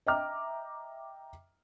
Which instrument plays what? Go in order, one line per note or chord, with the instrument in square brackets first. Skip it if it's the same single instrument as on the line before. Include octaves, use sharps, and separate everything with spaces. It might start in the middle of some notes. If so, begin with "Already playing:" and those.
[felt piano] D#5 E5 G5 A#5 D6 F6